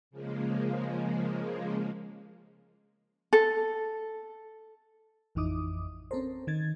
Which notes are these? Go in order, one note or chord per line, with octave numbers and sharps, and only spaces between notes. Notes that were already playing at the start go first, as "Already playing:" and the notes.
C#3 F3 G#3 A#3
A4
A1 F2 E3 D#4 D6 D#6
C4 C#4 A4 A#4 C5
D#3 G#6 A6